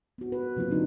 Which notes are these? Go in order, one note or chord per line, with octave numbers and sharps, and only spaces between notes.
B3 F#4
B4
C3 F#3 A#3 F4
D3 D4 D#4